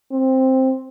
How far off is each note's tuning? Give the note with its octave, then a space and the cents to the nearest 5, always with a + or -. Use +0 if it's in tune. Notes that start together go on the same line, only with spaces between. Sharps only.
C4 +5